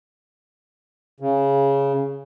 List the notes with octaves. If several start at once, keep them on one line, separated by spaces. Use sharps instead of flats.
C#3